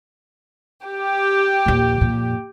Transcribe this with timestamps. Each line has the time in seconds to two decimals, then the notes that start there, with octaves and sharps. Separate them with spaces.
0.85 G4
1.66 A#1 D#2
2.01 F2 A#2